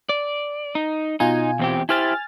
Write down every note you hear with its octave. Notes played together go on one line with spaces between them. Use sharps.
D5
D#4
B2 D#4 F4 G#5
E2 C4 G4
E4 G4 C5 G#5 F6 A6